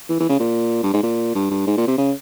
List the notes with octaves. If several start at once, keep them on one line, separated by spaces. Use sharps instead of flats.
E3
E3
C#3
A#2
G2
G#2
A#2
G2
G2
G#2
A#2
C3
C#3